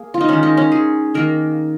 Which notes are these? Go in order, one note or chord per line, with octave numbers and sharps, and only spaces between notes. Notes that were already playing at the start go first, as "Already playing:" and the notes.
Already playing: A#3 G#4
F4
D#4
D#3 G#3 C#4
D#4
C#4
G#4
D#3 A#3 A#4